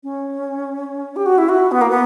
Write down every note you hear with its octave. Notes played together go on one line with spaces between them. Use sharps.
C#4
G4
F#4
E4
F#4
B3
A#3
B3